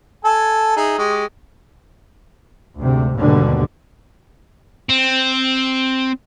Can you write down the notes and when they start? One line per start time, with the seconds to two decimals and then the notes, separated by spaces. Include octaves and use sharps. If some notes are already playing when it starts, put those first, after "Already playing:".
0.25 A4 G#5 E6
0.77 D#4 G#4 E5
0.98 G#3 G4 C#6
2.78 D2 G#2 C3
3.16 D#2 G#2 B2 D3 G3
4.89 C4